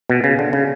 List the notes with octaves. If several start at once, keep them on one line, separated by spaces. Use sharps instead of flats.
B2
C#3
D3
C#3